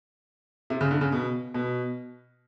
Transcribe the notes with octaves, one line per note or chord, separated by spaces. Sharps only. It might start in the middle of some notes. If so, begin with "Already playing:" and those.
C3
C#3
D3
C#3
B2
B2